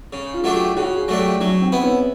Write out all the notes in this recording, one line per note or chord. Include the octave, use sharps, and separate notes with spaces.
C#3
F4
F#3 A3 D4
G4
C#3 F#4
G#4
F#3 A3 D4
G4
F#3 C#4
C4
B3 E4
C#4